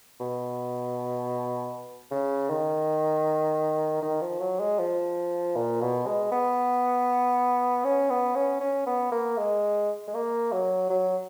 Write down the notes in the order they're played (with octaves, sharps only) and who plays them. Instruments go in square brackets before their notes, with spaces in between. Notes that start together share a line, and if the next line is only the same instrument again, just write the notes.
[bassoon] B2
C#3
D#3
D#3
F3
F#3
G#3
F3
A#2
B2
G#3
B3
C#4
B3
C#4
C#4
B3
A#3
G#3
G#3
A#3
F#3
F#3